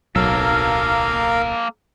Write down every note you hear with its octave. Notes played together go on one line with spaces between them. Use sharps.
D1 B1 F#3 A#3 A4 A#4 F5